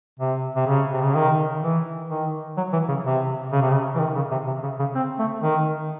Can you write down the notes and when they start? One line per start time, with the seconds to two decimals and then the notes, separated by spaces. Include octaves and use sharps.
0.20 C3
0.56 C3
0.67 C#3
0.93 C3
1.03 C#3
1.15 D#3
1.62 E3
2.09 D#3
2.57 F#3
2.73 E3
2.89 C#3
3.05 C3
3.52 C#3
3.62 C3
3.72 C#3
3.96 E3
4.00 D#3
4.16 C#3
4.31 C3
4.47 C3
4.63 C#3
4.79 C#3
4.95 C4
5.19 A3
5.42 D#3